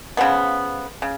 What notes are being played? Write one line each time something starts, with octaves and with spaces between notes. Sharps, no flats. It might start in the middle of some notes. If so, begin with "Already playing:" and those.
C#3 F3 B3
C#3